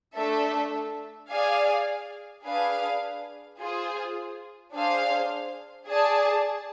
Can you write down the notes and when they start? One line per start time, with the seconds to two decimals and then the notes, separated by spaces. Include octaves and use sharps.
0.16 A3 D4 A4 E5
1.30 G#4 D5 F5 G#5
2.45 D4 G#4 B4 F5
3.59 F4 G#4 C5
4.74 D4 G#4 C5 F5
5.88 G#4 D5 A5